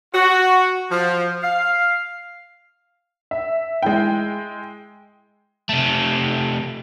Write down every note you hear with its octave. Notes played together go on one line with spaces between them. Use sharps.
F#4
F3
F5
E5
G#3 E4 G5
C3 A3